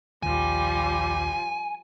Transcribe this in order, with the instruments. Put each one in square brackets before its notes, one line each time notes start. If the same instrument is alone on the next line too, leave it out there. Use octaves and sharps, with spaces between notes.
[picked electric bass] A#1 D#2 D#3 [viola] F3 G3 [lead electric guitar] G#5